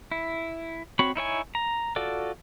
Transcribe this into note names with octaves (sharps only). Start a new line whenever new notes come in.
E4
C4 F#4 C#5 B5
D#4 E4 C#5 G#5
A#5
F4 F#4 A4 D5